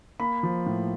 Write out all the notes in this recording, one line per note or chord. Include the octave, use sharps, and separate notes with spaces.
A#3 B5
F3
A2